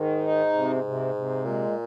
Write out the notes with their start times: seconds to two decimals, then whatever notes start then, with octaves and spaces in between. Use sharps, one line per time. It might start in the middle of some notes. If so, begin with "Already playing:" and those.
Already playing: G#2 D#3
0.22 D#4
0.53 C3
0.84 C3
1.15 C3
1.45 A#2 G#3